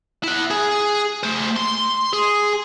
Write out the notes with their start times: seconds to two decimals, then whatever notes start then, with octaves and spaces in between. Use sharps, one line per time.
0.23 E4 F#5
0.51 G#4
1.23 A3 C5
1.56 C6
2.13 G#4